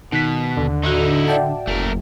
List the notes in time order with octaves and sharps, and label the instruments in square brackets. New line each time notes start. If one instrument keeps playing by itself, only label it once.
[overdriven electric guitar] B2 [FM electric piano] D#3 F#6 B6
[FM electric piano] D#2 [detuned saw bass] D3
[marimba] A2 F#4 [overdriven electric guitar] D#4 E4
[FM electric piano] D5 G5 A5 [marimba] E5 F#5
[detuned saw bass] F#1 [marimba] E2 [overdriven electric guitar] A3 A#4